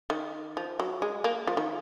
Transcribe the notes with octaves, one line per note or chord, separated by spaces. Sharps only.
D#3
F3
F#3
G#3
A#3
F3
D#3